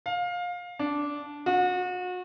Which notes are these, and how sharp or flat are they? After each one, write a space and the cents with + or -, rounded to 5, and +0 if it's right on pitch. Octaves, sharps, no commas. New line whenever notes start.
F5 +20
D4 -10
F#4 -35